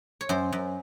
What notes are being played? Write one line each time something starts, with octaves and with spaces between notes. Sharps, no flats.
C#5
F#2 C5
F#2